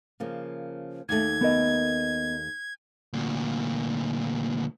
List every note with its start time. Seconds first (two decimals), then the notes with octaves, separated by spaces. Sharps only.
0.20 C#3 F3 A#3
1.09 D#2 A3 G#6
1.41 B3 A#4 D#5
3.13 D2 A#2